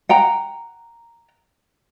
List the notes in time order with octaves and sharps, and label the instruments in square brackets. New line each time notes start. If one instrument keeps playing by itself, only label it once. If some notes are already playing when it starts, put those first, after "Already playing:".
[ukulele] F#5 G5 A#5